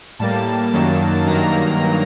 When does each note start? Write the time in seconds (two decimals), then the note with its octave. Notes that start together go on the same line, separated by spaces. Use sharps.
0.19 A2 G3 A#3 A5
0.73 F#2 D#3 F#3 A#3
1.26 G2 D#3 F#3 A#3 A#5